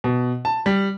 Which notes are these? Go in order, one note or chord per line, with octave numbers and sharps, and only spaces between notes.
B2
A5
G3